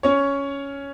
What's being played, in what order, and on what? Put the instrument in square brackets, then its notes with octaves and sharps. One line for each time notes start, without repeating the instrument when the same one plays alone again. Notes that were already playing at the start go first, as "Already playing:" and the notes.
[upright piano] C#4 C#5